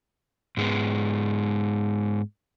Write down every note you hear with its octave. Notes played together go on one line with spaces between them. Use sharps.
G#2 G#3 B3